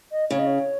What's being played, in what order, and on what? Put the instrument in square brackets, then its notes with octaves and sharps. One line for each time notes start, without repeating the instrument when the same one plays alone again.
[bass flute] D#5
[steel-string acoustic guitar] C#3 [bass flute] C#5
[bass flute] D#5
C#5